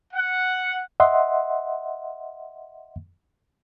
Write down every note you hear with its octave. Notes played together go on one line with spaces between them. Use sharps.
F#5
D#5 E5 F#5 C6